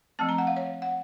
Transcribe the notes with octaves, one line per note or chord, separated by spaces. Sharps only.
F3 A3 C4 A5
A#5
F#5
F5
C#5
F#5